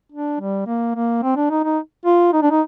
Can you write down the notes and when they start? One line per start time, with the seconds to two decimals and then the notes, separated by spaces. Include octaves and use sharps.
0.12 D4
0.40 G3
0.67 A#3
0.95 A#3
1.23 C4
1.36 D4
1.50 D#4
1.64 D#4
2.05 F4
2.33 D#4
2.42 D4
2.51 D#4